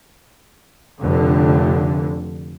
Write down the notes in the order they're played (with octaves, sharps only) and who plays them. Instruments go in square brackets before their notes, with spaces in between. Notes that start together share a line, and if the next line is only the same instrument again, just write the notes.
[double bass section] F1 D3